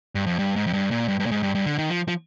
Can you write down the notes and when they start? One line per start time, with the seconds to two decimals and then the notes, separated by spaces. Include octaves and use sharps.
0.15 G2
0.26 F2
0.39 G2
0.56 G#2
0.67 F2
0.73 G2
0.91 A#2
1.08 G2
1.20 G2
1.26 A#2
1.31 G#2
1.43 G2
1.55 G2
1.66 D3
1.78 D#3
1.90 F3
2.08 F3